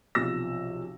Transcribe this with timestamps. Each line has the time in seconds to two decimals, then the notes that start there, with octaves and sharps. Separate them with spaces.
0.15 B1 C3 F3 E6 A#6